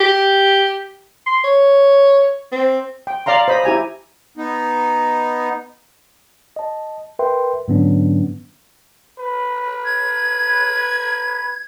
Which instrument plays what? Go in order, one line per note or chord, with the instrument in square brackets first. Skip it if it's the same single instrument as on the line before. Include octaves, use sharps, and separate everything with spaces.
[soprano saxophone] G4
C6
C#5
C4
[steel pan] G5
D5 F5 A#5 C6
C5 D#5 B5
E4 G4 G#5 A#5
[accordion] B3 D#4
[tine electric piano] D#5 A5
A#4 B4 E5 G5 C6
G#2 D3 F#3 B3 C#4 D4
[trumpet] B4
[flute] G#6